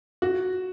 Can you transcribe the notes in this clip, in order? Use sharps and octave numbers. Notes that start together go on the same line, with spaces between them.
F#4